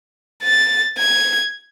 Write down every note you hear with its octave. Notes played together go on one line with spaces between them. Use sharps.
A6
G#6